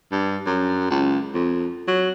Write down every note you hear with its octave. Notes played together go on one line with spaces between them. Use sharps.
G2
F#2
C#2
F2
F#3